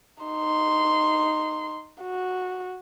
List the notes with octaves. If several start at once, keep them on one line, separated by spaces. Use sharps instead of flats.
D#4 C6
F#4